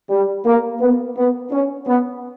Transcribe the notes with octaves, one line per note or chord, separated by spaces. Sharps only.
G3
A#3
B3
B3
C#4
B3